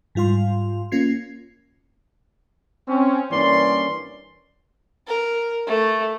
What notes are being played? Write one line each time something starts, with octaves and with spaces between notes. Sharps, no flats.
G#2 G3 F4 F5 C6
A#3 C#4 F4 G#6 C7
C4 C#4
G2 E3 A#3 C#4 D5 C6
A#4
A3